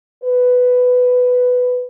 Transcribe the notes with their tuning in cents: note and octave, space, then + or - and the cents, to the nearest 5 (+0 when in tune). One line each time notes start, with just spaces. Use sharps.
B4 +10